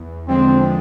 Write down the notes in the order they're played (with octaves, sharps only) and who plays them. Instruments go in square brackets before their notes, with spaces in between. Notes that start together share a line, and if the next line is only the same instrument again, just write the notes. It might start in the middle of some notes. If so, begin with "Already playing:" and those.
Already playing: [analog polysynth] E2
[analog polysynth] D3 F3 G#3 D4 [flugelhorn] C4